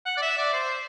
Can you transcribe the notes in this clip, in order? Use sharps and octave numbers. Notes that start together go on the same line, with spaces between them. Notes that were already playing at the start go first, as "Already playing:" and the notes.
F#5
D5
E5
D5
C5